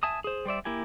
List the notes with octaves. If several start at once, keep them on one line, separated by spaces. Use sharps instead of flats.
E5 G#5 A5 D#6
G#4 C5
G3 C5 D5 E5
A#3 E4 G4 G#5